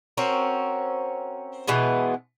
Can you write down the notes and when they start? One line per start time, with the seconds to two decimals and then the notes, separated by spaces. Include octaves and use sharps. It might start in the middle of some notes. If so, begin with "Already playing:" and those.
0.17 C4 C#4 F#4 A#4
1.68 B2 E3 G#3 B3